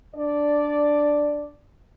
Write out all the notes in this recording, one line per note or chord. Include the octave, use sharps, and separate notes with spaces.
D4 D5